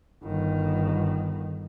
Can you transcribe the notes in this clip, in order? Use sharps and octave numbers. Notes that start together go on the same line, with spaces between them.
G1 D#3